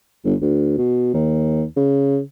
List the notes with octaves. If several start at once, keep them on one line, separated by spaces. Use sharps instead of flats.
G1
D2
B2
D#2
C#3